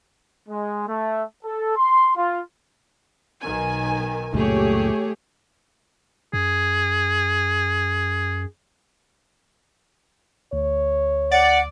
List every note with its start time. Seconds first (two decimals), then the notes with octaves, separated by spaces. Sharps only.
0.48 G#3
0.88 A3
1.44 A4
1.75 C6
2.15 F4
3.41 B1 D#3 G#5
4.34 C#2 F#2 A#2 A3 G4 G#4 C#5
6.33 F#2 G#4
10.53 D2 C#5
11.32 D5 F#5